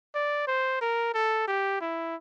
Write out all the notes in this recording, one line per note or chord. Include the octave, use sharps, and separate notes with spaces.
D5
C5
A#4
A4
G4
E4